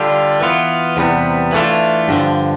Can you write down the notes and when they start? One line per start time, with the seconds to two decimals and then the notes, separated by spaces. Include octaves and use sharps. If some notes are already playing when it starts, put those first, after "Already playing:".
Already playing: D3 G3 D4 F4
0.40 E3 B3 F4
0.97 E2 C3 G3 B3
1.53 E3 A3 D4 F4
2.08 G2 D3 F3